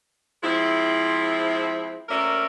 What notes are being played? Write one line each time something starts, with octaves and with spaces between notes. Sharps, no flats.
F3 G#3 C4 E4
D2 A#3 C#4 A#4 D5 E5